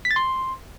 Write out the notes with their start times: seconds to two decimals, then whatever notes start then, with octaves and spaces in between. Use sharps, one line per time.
0.05 B6
0.11 A6
0.16 C6